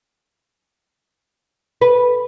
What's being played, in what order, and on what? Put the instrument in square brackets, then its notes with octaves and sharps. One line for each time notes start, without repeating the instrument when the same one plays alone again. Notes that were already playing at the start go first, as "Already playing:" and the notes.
[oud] B4